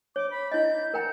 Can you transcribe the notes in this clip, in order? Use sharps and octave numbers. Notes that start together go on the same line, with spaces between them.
C#5 D6
B5
E4 D#5 G6
A#4 F#5 G5 A#5